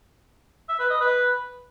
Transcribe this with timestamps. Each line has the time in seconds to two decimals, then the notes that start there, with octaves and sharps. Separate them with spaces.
0.69 E5
0.80 B4
0.90 D#5
1.01 B4